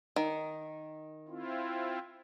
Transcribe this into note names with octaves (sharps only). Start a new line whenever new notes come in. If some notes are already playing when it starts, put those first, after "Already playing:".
D#3
C4 E4 F4